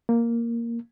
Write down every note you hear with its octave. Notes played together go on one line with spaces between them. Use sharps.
A#3